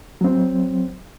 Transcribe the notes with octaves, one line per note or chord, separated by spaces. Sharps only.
F#3 C4